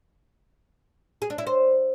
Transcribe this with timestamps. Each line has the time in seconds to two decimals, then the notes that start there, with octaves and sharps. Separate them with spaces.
1.22 G#4
1.30 D4
1.38 E4
1.47 C5